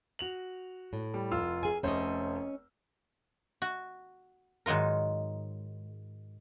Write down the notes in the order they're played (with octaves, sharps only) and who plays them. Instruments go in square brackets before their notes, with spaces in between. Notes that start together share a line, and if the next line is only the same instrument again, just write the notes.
[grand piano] F#4 F7 F#7
[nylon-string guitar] A2
[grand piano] G3
F1 F4 E6
[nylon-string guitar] G#4 G#5
[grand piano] F1 A3 C5 [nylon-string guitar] C#4 C#5 D#5
[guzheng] F#4
G#2 D#3 F#3 F4 A#4